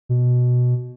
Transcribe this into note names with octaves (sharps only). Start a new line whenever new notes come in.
B2